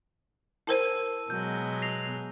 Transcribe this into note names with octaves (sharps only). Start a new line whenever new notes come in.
E4 A#4 C5 A5 E6 D#7
B2 F#3 G#3 G6
A#6 C7 F7